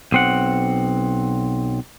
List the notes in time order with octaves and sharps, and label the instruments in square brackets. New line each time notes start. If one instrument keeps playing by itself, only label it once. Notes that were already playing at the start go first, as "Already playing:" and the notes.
[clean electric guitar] B1 C4 F#5